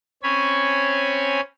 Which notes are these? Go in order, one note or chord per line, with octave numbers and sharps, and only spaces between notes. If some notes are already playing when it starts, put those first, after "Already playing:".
C4 C#4 C#5 G#5 B5